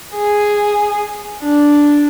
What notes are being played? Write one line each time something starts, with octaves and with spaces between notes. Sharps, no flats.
G#4
D4